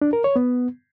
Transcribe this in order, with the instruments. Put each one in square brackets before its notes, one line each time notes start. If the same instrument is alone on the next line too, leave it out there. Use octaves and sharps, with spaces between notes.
[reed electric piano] D4
A#4
C#5
B3